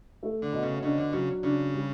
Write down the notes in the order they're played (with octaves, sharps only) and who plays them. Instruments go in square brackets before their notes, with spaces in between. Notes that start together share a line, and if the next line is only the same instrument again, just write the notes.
[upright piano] A3
[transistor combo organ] D3
[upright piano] B2
[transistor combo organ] C#3
[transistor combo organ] C#3 [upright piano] D4
[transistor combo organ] D3
[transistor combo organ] C#3 [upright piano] F#3
[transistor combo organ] C#3 [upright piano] D4
[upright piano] G3